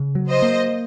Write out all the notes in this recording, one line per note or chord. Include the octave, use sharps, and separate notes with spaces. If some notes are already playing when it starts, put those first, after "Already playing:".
Already playing: C#3
F#3
C5 D#5
A#3